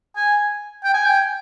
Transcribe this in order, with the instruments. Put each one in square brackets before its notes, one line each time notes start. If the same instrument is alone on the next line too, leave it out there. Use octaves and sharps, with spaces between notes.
[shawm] G#5
G5
G#5
G5